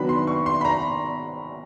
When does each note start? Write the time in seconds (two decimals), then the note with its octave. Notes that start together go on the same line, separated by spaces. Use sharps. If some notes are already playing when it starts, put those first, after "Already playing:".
Already playing: D#3 F#3 B3 D4 B5
0.09 C6
0.27 C#6
0.46 C6
0.61 B5
0.65 A#5